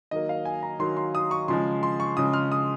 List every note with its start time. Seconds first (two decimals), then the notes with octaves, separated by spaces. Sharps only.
0.11 D#3 F#3 A#3 D#5
0.29 F5
0.45 G#5
0.63 A#5
0.79 D#3 F#3 A#3 C6
0.97 C6
1.15 D#6
1.31 C#6
1.48 C#3 F3 G#3 C6
1.83 C6
2.00 C#6
2.17 C#3 F3 G#3 D#6
2.33 F6
2.52 D#6